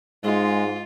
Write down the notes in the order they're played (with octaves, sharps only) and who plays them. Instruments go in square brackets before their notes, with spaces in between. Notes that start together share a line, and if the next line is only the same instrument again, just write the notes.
[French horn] G#2 [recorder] G#3 [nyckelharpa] F4